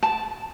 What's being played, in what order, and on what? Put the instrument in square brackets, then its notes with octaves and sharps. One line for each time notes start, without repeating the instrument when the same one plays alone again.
[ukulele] A5